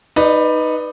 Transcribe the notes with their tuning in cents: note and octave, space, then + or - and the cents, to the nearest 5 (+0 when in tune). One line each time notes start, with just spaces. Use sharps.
D#4 +0 B4 +0 D5 +25